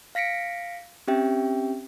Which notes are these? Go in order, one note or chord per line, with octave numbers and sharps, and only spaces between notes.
F5 A#6 B6 C#7 D7
C4 C#4 G4 E5 G5